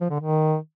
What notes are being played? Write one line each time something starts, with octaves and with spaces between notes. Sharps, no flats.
F3
D3
D#3